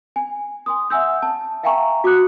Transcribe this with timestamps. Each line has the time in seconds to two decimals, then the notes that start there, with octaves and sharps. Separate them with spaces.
0.16 G#5
0.66 G#5 C6 D#6
0.90 E5 F#5 G#5 E6 G6
1.22 A5
1.63 E5 F5 G5 G#5 A#5 C#6
2.04 F#4 D6 D#6 F#6 C#7